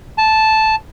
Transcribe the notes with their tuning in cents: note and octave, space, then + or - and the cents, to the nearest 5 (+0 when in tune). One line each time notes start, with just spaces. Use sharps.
A5 -10